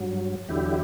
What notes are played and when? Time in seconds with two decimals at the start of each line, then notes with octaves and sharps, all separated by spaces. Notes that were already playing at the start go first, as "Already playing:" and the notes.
Already playing: G2 F#3
0.49 E2 D3 F#3 E4 G4